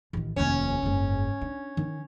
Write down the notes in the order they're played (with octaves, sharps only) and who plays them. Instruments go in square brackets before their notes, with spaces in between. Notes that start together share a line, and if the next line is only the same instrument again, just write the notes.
[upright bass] A1 D#3
[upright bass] F1 D#2 [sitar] C#4
[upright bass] F#1 G#2
D4
D#3